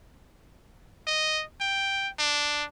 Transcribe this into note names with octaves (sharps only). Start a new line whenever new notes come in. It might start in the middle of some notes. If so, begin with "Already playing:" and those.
D#5
G5
D4